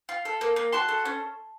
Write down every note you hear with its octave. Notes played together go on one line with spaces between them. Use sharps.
F4
A4
A#3
A#3
F#4 A5 C6
A4
C#4